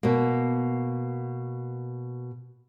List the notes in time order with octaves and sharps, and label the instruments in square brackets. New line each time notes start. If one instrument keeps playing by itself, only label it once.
[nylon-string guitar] B2 A#3